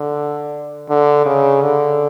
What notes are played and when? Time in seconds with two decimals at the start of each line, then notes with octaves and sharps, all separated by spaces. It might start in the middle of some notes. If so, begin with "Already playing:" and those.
Already playing: D3
0.89 D3
1.26 C#3
1.62 D3